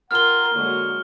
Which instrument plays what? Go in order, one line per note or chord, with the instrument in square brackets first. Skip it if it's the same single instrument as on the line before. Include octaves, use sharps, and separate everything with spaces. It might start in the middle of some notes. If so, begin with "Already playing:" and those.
[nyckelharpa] F4 A#4 [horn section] F#5 G5 A#5 [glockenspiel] F6 G7
[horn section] D3 [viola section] F#3 G#3 [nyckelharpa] A#3